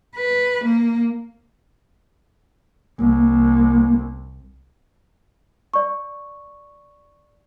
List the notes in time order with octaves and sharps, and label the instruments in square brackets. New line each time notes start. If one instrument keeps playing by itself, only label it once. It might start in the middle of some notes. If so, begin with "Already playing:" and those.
[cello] B4
A#3
[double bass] C2 [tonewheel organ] A#3
[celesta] D5 C#6